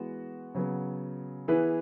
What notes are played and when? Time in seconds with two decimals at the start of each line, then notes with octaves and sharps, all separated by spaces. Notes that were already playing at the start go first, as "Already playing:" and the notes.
Already playing: E3 G#3 B3 F#4
0.55 C#3 F#3 B3
1.48 E3 B3 E4 G#4 B4